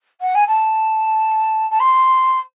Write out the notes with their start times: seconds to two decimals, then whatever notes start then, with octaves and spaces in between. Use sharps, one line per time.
0.21 F#5
0.34 G#5
0.47 A5
1.70 A5
1.79 C6